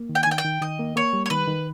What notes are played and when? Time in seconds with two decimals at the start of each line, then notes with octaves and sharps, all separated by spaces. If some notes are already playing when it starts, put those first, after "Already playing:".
Already playing: A#3
0.09 D#3
0.15 G5
0.23 G#5
0.27 D#3 G5
0.38 G5
0.44 D#3
0.62 D#3 D#5
0.79 A#3
0.96 A#3 C#5
1.13 G3
1.26 C#5
1.30 D#3 B4
1.48 D#3